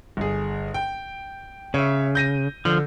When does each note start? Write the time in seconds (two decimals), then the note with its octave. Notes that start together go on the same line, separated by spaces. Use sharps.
0.17 G1 G#4
0.74 G5
1.74 C#3 C#5 E5
2.15 G6 A#6 D#7
2.65 D3 F3